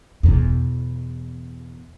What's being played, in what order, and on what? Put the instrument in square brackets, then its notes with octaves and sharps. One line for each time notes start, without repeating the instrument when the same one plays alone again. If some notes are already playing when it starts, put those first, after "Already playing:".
[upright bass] E2 B2